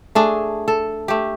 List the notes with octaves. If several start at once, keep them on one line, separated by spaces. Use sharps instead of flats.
A3 D4 G#4
A4
A3 G4